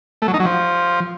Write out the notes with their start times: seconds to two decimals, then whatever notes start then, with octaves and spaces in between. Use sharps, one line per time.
0.22 A3
0.28 F#3
0.34 D#4
0.40 F#3
0.46 F3